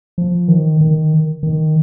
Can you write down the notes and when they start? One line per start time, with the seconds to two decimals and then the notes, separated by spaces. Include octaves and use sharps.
0.18 F3
0.48 D#3
0.81 D#3
1.43 D#3